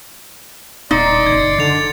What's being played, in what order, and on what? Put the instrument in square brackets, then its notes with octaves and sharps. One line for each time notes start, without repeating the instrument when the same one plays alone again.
[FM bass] D#1 [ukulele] D#4 [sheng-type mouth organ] D5 C6 [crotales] A6 C#7
[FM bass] F#1 [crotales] G#6
[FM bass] D3 [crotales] A6 F7